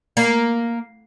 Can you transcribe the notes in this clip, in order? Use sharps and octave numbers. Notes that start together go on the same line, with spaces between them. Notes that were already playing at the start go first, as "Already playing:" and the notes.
A#3